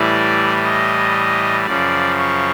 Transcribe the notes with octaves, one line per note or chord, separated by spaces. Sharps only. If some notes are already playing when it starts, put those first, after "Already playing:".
Already playing: A2 E3 G3 D5
D#5
F#2 C#3 F3 D5
C#5